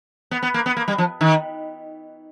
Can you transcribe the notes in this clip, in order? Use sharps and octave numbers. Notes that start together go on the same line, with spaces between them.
B3
B3
A#3
B3
A#3
G3
F3
D#3